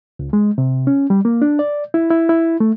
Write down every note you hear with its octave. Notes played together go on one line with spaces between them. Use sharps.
C#2
G#3
C3
C#4
G3
A#3
D4
D5
E4
E4
E4
A3